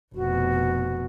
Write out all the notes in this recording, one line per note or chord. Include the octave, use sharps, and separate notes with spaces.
F1 B2 F#4